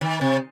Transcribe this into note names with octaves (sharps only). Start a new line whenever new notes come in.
D#3
C3